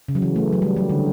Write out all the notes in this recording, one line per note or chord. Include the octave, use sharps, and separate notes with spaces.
C#3
F#3
E3
A3
F#3
G3
F#3
D3